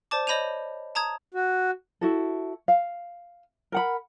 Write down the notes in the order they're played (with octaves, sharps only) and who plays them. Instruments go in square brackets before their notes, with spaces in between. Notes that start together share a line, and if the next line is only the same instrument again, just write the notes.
[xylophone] C5 D5 A5 D6
C#5 D#5 B5 G6 D#7 F7
A5 A#5 D#6 G#6
[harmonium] F#4
[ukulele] E4 F#4 A4
F5
A#4 F#5 B5